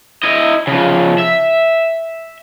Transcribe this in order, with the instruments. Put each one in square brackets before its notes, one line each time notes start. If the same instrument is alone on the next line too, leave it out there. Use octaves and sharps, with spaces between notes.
[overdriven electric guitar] E4 D#5
C#3 F3
E5